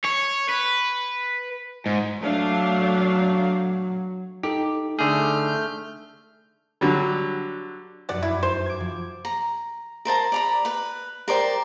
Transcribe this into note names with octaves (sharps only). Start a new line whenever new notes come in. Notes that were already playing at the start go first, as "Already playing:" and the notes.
C#5
B4
G#2
F#3 A3 D4 F5
D#4 G4 A4
D3 A3 G#4 F6 G6
D3 F#3 G3
F1 F#2 D5 F#5
E4
C5
D6 G#6
F3
A#5
A#4 C5 A5 A#5
D5 A#5 B5
B4 B5
A#4 C5 D5 G5